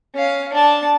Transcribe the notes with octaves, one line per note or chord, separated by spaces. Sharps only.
C#4 F5
D4 A5